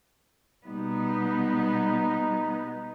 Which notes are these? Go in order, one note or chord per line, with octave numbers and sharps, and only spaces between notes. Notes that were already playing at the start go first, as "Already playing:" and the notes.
B2 G3 B3 D#4